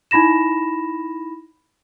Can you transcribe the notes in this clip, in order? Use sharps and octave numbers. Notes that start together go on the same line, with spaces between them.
D#4 E4 B5 A#6 E7